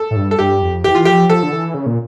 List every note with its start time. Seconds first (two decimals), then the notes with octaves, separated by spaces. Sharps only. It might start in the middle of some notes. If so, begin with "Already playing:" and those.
Already playing: A4
0.11 A2
0.16 G2
0.31 A4
0.39 G2 G4
0.62 F2
0.84 E3 G4
0.95 F4
1.05 F3 G4
1.29 F3 A4
1.43 D3
1.52 E3
1.74 C#3
1.86 A#2